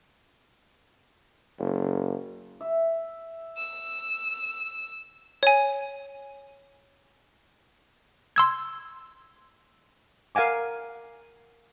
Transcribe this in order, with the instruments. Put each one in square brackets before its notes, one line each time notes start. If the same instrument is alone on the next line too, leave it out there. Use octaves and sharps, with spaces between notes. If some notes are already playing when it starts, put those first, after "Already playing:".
[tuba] F#1
[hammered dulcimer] E5
[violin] E6
[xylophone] C#5 G#5
[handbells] C6 E6 G#6
[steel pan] A#4 F5 F#5 G#5 D6